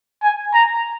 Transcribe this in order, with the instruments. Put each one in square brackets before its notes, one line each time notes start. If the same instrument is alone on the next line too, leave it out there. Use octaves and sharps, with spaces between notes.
[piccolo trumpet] G#5
A#5